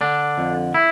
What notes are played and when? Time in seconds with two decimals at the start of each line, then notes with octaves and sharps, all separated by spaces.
0.01 D3 D4
0.38 F2
0.74 E4